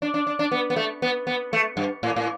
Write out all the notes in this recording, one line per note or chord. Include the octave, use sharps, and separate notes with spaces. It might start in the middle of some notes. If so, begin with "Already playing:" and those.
D4
D4
D4
D4
B3
B3
A3
B3
B3
A3
G2
A2
A2